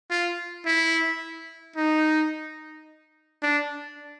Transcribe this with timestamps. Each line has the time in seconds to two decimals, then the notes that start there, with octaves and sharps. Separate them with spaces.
0.10 F4
0.66 E4
1.76 D#4
3.42 D4